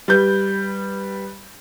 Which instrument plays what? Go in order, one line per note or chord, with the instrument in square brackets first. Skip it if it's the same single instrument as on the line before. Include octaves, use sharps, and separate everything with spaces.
[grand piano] G3 B4 G6